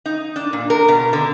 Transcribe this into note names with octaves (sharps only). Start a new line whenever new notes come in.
D#4
D4
A#2
A#4
B2
D3